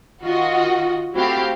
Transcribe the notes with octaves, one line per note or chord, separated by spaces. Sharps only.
D#3 F4 F#4 D#5
A3 C4 E4 F#4 G4 F5